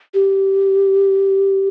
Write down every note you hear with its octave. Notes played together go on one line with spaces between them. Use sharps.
G4